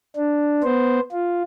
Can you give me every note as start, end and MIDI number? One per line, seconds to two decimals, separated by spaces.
0.16 0.63 62
0.63 1.00 59
0.63 1.00 72
1.12 1.43 65